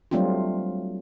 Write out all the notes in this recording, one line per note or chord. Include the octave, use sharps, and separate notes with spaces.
F#3 G3 A3 C4 D4 F4